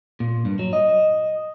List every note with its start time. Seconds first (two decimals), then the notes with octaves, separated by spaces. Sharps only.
0.20 A#2
0.45 G2
0.59 F#3
0.73 D#5